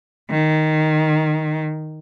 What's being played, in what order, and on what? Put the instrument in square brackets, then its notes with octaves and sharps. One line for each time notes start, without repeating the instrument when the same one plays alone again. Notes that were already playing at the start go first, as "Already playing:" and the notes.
[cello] D#3